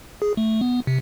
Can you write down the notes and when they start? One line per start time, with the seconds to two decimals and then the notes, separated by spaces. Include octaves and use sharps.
0.22 G#4
0.37 A3
0.61 B3
0.87 C3